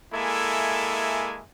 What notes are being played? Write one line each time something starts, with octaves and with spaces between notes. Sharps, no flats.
G#3 A#3 E4 A4 E5 G#5